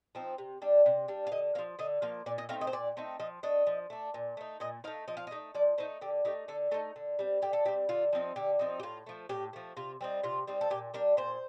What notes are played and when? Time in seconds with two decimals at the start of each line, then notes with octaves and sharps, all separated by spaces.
0.15 F3 C4 D#4
0.38 C3
0.62 G3 D4
0.86 C3
1.08 G3 D4
1.27 F5
1.32 D3 D#5
1.55 A#3 F5
1.59 F3
1.79 D3 D#5
2.02 F3 A#3 F5
2.26 A#2 D5
2.38 D#5
2.49 A3 C4 D#4 F5
2.61 D#5
2.67 C5
2.72 A#2 D5
2.97 A3 C4 D#4
3.20 F3 D#5
3.43 A3 D4 D#5
3.67 F3
3.90 A3 D4
4.14 A#2
4.37 A3 D#4
4.60 A#2 D#5
4.84 D#4 F5
4.87 A3
5.08 F3 D#5
5.17 F5
5.27 D#5
5.31 A3 D#4
5.54 F3 D5
5.78 A3 D#4 C5
6.01 D3 G4
6.25 A3 D#4 G4
6.48 D3 A4
6.71 A3 D#4 A4
6.96 D3
7.19 G3 C4
7.42 D3 G4
7.53 A4
7.65 C4 G4
7.68 G3
7.89 D3 F4
8.13 F3 C4 D#4
8.36 D3 G4
8.59 F3 C4 D#4
8.80 G4
8.83 A2 F4
9.06 F3 A3
9.29 A2 G4
9.53 F3 A3
9.77 C3 F4
10.01 G3 C4 D#4
10.23 C3 F4
10.47 G3 C4 D#4
10.61 A4
10.70 A#2 G4
10.94 G3 D4 A#4
11.17 A#2 C5